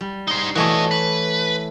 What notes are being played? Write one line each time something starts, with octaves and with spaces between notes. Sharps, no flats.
G3
D#4 C5
E3 A3 F#4 C#5 D#5
B4